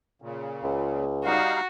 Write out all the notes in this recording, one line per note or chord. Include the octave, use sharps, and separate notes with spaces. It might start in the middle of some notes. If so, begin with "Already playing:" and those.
A#2 C#3
C#2
G3 D#4 F#4 F5